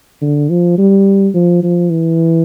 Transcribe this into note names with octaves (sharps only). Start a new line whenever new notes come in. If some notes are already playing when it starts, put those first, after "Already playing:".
D3
F3
G3
F3
F3
E3